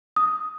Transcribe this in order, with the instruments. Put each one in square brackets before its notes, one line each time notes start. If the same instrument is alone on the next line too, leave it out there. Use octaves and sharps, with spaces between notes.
[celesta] D#6